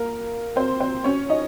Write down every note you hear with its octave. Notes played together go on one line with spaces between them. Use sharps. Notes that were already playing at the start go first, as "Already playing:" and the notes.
Already playing: A#3 A#4
C4 C5
C4 C5
C#4 C#5
D#4 D#5